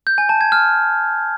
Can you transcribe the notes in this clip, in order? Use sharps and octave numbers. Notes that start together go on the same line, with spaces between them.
G6
G#5
A5
G#6
F6